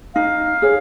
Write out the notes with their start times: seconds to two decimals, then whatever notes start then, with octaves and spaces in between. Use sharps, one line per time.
0.16 D#4 F5
0.62 G#4 C#5